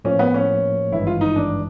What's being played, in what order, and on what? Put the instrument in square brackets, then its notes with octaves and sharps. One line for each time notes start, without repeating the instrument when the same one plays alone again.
[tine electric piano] A2 F3 A#3 [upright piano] C#4
[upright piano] B3
C#4
[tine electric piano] G#1 G2 E3 G#3 [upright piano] E4
[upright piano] F4
D#4
D4